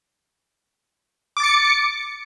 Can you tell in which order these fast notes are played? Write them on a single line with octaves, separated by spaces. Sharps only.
D6 A6 C#7